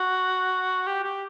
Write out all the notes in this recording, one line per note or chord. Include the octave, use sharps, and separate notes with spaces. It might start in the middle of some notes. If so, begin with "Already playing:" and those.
Already playing: F#4
G4
G4